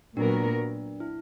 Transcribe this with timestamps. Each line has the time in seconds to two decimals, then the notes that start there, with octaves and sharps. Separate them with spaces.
0.17 A#2 F#3 B3 D4 F#4 A#4
1.00 E4